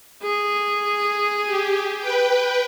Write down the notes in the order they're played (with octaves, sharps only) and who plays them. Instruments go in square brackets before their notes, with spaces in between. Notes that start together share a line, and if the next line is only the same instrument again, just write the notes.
[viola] G#4
[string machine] G4
B4 G5